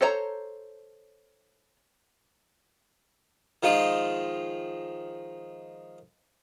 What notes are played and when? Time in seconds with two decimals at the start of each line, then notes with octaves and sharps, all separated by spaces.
0.01 A4 C5 C#5 G#5 A#5
3.63 D#3 F3 G#3 F4